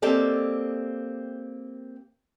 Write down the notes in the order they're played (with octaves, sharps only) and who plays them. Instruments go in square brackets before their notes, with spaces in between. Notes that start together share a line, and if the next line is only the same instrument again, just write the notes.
[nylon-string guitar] A#3 C4 G4 A4 D5 D#5